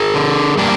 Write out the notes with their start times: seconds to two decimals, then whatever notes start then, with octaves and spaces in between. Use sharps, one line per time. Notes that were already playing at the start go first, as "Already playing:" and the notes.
Already playing: G#4 A#4
0.14 D3
0.57 G3 A#3 D4